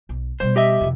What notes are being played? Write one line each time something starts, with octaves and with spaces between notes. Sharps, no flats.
B1
B2 G3 C5
G4 D#5 E5
F2 C3